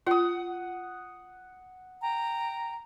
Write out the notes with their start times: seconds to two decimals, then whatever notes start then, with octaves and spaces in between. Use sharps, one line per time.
0.07 F4 F#5 D#6
2.00 G5 A#5